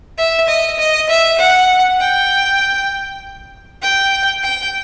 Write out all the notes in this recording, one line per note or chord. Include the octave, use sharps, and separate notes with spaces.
E5
D#5
D#5
E5
F#5
G5
G5
G5